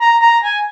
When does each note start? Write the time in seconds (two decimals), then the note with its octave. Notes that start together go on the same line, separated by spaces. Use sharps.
0.02 A#5
0.22 A#5
0.44 G#5